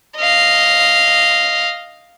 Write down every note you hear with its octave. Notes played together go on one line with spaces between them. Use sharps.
D#5 F5